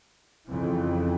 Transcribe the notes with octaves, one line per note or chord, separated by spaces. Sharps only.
F2 C#3 E3